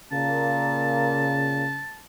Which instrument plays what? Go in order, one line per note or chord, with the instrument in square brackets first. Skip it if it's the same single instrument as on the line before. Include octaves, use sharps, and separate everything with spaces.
[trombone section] A#2 A#3 [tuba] C#3 [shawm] A5